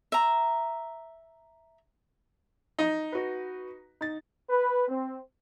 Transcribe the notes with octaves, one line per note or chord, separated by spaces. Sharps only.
E5 A#5
D#4
F#4 B4
D#4 A6
B4
C4